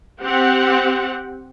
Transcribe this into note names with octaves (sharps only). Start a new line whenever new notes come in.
C4 G4 F#5